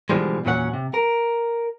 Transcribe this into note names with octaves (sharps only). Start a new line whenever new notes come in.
B2 D3 E3 F3 G3 G#3
E2 A#2 F#3 C#4 C#5 F#5
C3
A#4